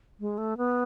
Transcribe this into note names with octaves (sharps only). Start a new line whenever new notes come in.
G#3
A3
B3